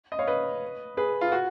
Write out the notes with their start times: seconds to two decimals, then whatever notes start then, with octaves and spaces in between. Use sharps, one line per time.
0.12 D#5
0.19 C#5 F5
0.27 B4 D#5
0.97 G#4 B4
1.21 F4
1.32 F#4